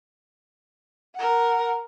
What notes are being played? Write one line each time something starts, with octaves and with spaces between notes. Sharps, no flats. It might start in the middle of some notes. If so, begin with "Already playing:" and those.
A#4 F#5